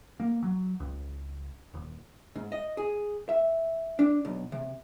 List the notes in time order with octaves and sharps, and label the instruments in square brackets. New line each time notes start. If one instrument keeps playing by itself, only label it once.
[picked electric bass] A#3
F#3
C#2
D#1
[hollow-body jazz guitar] G#2
D#5
G#4
E5
D4
B1
C3